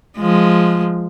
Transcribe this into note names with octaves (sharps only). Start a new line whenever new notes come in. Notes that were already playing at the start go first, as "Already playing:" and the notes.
F3 G#3